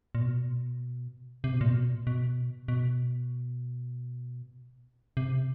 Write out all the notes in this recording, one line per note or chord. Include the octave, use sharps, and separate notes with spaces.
A#2
B2
C3
B2
A#2
B2
B2
B2
C3